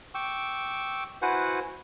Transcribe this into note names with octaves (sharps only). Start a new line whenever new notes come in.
G5 C#6 D6 E6
E4 F#4 B4 C5 F#5 G#5